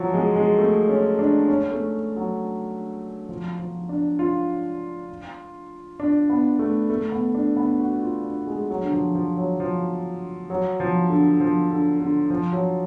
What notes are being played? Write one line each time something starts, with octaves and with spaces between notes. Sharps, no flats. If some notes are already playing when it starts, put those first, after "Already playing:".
Already playing: F3 F#3
G#3
G#3
A3
C#4
D4
C#4
A3
F#3
F3
F3
D4
F4
D4
B3
A3
A3
B3
D4
B3
F#4
F4
D4
G#3
F#3
D3
F3
F3
F#3
F3
F#3
F3
D3
F3
D3
D3
F3
F#3